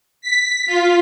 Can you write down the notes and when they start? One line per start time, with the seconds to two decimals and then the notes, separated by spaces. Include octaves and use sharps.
0.21 B6
0.66 F4